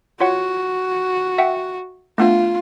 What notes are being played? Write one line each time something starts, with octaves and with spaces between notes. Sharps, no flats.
F4 F#4 C#5 F#5
E5 F#5 G5
A3 B3 D4 F4